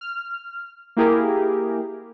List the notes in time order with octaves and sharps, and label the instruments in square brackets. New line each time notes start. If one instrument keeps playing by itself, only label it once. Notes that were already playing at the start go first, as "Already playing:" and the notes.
[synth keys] F6
A#3 E4 G4 G#4 A#4